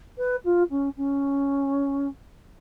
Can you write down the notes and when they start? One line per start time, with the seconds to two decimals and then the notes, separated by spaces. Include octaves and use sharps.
0.17 B4
0.44 F4
0.70 C#4
0.96 C#4